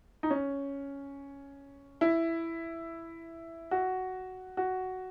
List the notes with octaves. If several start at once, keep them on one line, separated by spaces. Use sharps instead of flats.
D#4
C#4
E4
F#4
F#4